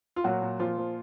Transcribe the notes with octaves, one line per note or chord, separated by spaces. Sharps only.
F4
A#2 F#3 F#4
A#2
A#2 F3 F4
F3